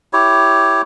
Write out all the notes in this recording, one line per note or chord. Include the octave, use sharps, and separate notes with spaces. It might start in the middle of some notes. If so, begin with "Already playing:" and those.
E4 G4 C#5